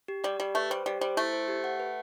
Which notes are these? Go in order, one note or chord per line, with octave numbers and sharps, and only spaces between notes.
G4
G3 D5
G3 G4
A3 B4
G3 C5
G3 G4
G3 C5
A3 E4
C5
G4
F#5
B4